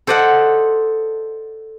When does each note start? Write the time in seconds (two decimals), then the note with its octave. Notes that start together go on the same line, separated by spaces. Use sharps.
0.07 A4 C5 D5 D#5 F#5